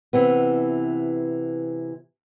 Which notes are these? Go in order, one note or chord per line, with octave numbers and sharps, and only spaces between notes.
C3 E3 B3